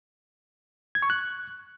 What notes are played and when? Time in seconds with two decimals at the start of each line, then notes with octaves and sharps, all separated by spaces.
0.95 G#6
1.02 C#6
1.10 F#6